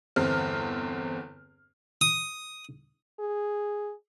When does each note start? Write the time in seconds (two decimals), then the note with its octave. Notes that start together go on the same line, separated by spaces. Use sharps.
0.16 G1 E2 C4 F6
2.01 D#6
3.20 G#4